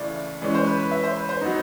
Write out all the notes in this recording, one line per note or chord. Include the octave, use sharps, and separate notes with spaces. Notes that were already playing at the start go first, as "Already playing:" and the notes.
Already playing: D2 C#3 E3 A3 D5
E3 G#3 C#4 D5
C5
B4
B4
E5
C5
B4
C5
F#3 B3 D#4